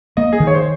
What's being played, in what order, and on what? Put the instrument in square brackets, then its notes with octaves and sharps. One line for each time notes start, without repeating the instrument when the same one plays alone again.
[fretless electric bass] A#3 [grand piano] D#5
[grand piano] G#4
[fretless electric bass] D#3
[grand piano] C#5
C5